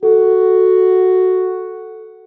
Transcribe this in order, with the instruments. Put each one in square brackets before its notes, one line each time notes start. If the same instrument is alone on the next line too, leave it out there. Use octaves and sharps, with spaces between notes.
[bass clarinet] F#4 [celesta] A4